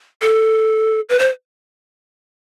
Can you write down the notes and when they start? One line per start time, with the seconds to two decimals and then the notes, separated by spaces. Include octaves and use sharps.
0.22 A4
1.09 B4
1.19 C5